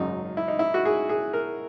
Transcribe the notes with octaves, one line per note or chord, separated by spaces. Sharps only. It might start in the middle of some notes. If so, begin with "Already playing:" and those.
Already playing: G#1 F#2 C#3 D#4
E4
D#4
E4
F#4
G#4
G#4
A#4